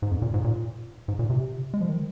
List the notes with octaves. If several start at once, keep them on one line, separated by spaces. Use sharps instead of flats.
G#2
F2
A#2
G#2
A#2
G#2
A#2
C3
G#3
F3
D#3